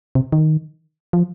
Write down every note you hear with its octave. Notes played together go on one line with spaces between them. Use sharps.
C3
D#3
F3